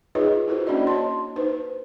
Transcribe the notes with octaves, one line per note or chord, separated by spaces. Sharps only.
D#4 F4 G#4 B4 C#5 D#5
E4 F#4 A4 C5
A#3 C#4 D4 F#4 D5 D#5
C#5 D#5 A5 C6
D#4 B4 C5